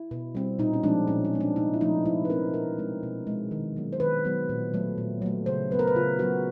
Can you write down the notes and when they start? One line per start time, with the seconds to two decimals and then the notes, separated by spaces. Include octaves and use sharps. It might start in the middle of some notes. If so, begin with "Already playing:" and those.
Already playing: E4
0.11 B2
0.35 G3 C4
0.59 A#2 D#4
0.73 C#4
0.83 F3 G#3 C4 D4
1.07 A#2 C#4
1.25 C#4
1.33 F3 G#3 C4
1.40 D4
1.56 C3 D#4
1.74 E4
1.81 F3 A3 C4 D#4
2.05 C3 E4
2.25 B4
2.30 F3 A3 C4 A#4
2.54 B2 A#4
2.78 G#3 C4
3.03 B2
3.27 G#3 C4
3.51 D#3
3.77 F#3 B3
3.93 C5
4.00 D#3 B4
4.25 F#3 B3
4.49 A#2
4.74 F#3 A3
4.98 A#2
5.22 F#3 A3
5.46 C#3 C5
5.71 F#3 B3 B4
5.79 A#4
5.87 B4
5.95 C#3 F4
6.19 F#3 B3 F#4